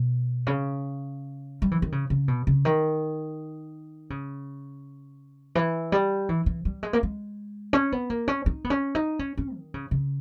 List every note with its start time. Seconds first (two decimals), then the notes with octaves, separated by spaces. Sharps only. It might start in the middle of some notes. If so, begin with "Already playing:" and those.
Already playing: B2
0.47 C#3
1.62 G3
1.71 E3
1.82 D#3
1.92 C#3
2.10 C#3
2.28 B2
2.47 C#3
2.65 D#3
4.10 C#3
5.55 E3
5.92 G3
6.29 E3
6.46 E3
6.65 G3
6.83 G#3
6.93 A#3
7.03 G#3
7.73 C#4
7.92 B3
8.10 A#3
8.28 C#4
8.46 D#4
8.64 B3
8.70 C#4
8.95 D#4
9.19 C#4
9.37 C#4
9.55 D#3
9.74 C#3
9.91 C#3